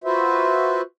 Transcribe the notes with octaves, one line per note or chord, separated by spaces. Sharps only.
F4 F#4 B4 C5 E5